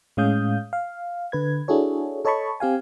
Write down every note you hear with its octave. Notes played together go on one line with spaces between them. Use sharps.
A2 G#3 C#4 F5 D#6 G6
F5
D3 B4 G#6
D4 E4 F#4 G#4 A4 C#5
A4 C#5 D#5 A5 B5 C#6
C4 G4 F5 G#5